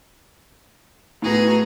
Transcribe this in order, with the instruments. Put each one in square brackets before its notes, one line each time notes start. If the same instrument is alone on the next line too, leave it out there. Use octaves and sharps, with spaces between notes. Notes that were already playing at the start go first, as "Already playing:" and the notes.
[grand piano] A2 B3 [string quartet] F#4 G#4 A#5